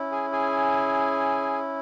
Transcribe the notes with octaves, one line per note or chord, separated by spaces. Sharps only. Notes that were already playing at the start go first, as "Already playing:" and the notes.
Already playing: C#4 E4
G#4 G#5
G#4 G#5